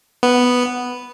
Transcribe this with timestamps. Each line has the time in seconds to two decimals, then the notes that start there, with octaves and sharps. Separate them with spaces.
0.23 B3